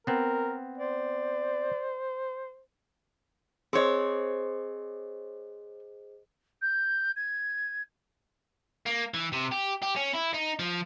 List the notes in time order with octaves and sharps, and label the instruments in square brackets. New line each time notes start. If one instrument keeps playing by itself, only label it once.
[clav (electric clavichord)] B3 C4 [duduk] A#4
[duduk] C5 [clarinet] D5
[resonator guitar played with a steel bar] C4 C#5 [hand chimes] G#4 C5 D#5
[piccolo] G6
G#6
[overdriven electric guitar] A#3
E3
C3
G4
G4
C#4
E4
D#4
F3